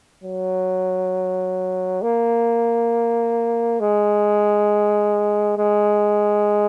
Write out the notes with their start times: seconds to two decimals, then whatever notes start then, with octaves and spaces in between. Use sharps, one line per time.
0.24 F#3
2.02 A#3
3.80 G#3
5.57 G#3